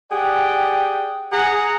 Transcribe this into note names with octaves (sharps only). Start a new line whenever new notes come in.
G4 G#4 D5 F#5 G5
G#4 F#5 A#5